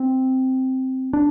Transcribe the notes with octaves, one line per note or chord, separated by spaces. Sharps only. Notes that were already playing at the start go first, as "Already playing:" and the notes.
Already playing: C4
D4